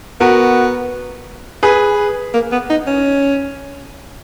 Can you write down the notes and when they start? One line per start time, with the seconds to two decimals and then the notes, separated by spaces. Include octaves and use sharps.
0.20 B3 F#4 A#4
1.63 G#4 B4
2.34 A#3
2.52 B3
2.70 D#4
2.87 C#4